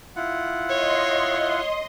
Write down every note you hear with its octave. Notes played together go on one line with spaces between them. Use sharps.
E4 F4 F#5
C#5 D#5 C6